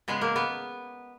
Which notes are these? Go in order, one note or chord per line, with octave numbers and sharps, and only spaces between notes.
C#3 G#3 B3
A#3
B3